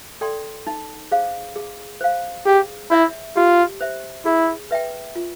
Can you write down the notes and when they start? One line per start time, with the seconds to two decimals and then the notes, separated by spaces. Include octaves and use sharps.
0.21 A4 D5 G5 C6
0.67 D#4
1.11 G#4 C5 F5
1.56 G#4
2.01 C5 F5
2.45 G4 G#4
2.91 E4 C#5 E5
3.36 F4 G4
3.81 C5 E5
4.25 E4 G#4
4.71 B4 E5 G5
5.16 F4